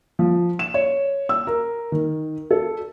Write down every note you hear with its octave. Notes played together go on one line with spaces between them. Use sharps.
F3
E7
C#5
E6
A#4
D#3
A4